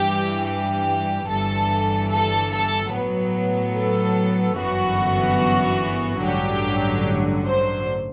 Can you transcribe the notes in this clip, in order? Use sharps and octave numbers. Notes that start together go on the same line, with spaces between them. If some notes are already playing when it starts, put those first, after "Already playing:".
Already playing: G2 E3 G3 G4
G4
G1 G2 E3 A4
A4
A4
A2 F#3 B3
A4
G1 F#2 E3 B3 F#4
A1 G2 D3 F#3 G4
C5